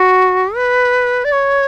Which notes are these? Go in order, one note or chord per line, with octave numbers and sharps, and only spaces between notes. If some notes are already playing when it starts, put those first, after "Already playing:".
Already playing: F#4
B4
D5
C#5